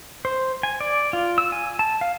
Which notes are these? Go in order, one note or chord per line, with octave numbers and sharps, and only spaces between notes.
C5
G#5
D5
F4
E6
G#5
A5
F5